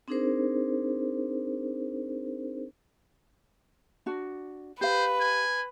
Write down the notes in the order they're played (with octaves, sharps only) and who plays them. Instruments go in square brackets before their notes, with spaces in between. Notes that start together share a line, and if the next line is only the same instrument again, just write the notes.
[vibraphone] C4 D4 D#4 G#4 A#4 C5
[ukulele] D4 F#4
[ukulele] G4 F5 [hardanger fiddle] B4 [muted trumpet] C5
[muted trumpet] G#5